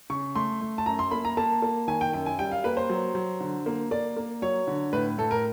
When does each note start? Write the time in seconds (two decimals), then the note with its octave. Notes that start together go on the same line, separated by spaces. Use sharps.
0.10 C#3 C#6
0.35 A3 C6
0.61 A3
0.78 A5
0.86 F#2 A#5
0.99 C6
1.11 A#3 B5
1.25 A#5
1.37 A#3 A5
1.62 A#3
1.88 D#3 G#5
2.01 G5
2.13 F#2 G5
2.26 G#5
2.39 G3 G5
2.52 F5
2.64 A#3 B4
2.77 C5
2.90 F#3
3.15 F#3
3.41 D3
3.66 A#3
3.91 A#3 D5
4.16 A#3
4.42 F#3 C#5
4.67 D3
4.93 A2 B4
5.18 A2 A4
5.31 A#4